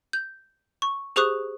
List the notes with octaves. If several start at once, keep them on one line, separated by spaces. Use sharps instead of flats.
G6
C#6
G4 G#4 C5 C#6 D#6 F#6